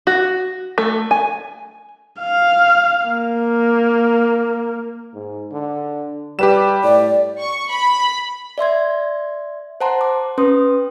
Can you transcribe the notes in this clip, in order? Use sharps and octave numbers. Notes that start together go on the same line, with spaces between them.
F#4
A3
G#5
F5
A#3
G#2
D3
G3 G4 B4 E7
A2 D5
C#6
B5
D5 E5 C6 G#6
C5 F#5 A5 A#5 C6
D6
C#4 B4 C6 D#6